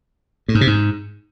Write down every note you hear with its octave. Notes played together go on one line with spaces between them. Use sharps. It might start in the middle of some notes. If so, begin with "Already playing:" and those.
A2
G#2
C3
G#2